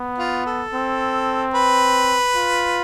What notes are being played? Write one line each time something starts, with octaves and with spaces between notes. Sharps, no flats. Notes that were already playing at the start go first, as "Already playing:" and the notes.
Already playing: B3
F4
A4
C4
B4
F4